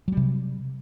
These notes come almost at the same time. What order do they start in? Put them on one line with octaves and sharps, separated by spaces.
F#3 G3 C3